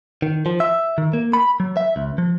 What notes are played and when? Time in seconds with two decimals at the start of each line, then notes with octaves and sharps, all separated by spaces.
0.22 D#3
0.46 F3
0.60 E5
0.98 D#3
1.13 A#3
1.33 B5
1.60 F#3
1.77 E5
1.96 C#2
2.18 F3